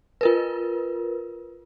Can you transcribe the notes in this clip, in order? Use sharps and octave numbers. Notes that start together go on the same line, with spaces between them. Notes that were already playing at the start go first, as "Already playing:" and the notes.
F4 A#4 B4